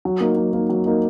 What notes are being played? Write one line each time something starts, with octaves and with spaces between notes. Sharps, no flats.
F#3
A#3 D#4
F#3
A#3 D#4
F#3
A#3 D#4